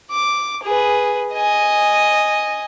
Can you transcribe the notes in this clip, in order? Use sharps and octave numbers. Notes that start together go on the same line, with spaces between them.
D6
G#4 B4
D#5 G#5